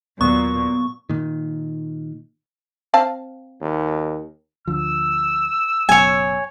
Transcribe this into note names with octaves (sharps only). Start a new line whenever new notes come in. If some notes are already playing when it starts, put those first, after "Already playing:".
D#2 A#2 F#3 B3 C#6
A#2 D#3
C4 F5 A5
D#2
D2 D3 F3 E6
F#1 F#2 B2 C#5 G#5